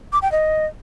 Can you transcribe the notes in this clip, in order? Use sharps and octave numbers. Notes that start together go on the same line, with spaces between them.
D6
G5
D#5